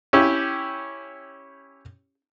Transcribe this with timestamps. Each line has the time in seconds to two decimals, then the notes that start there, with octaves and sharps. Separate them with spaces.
0.13 C#4 E4 G4